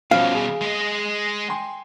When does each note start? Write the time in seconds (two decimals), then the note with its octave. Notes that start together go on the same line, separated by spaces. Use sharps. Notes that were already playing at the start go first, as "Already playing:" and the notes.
0.11 B2 F3 G3 C#4 F#4 F5
0.34 G#4
0.61 G#3 D#5
1.48 G5 G#5 C6